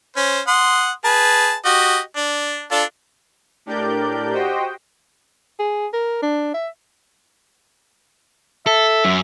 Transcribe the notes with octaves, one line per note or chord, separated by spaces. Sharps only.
C#4 C5
F#5 C6 D#6
G#4 B4 A5
F#4 G4 D#5
D4
D4 F4 A4
A2 D4 G4 A#4 D5 G6
F#4 G4 C5 D#5 G5
G#4
A#4
D4
E5
A4 E5
F#2